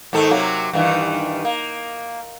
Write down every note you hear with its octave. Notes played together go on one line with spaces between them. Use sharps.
G#2 D#3 A4
C3 F#3 A#3
G2 D#3 E3
A#3